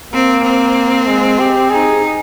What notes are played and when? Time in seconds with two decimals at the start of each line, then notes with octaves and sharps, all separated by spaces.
0.13 A#3 C4
0.44 C4
1.07 G#3
1.39 G4
1.70 D#4 G#4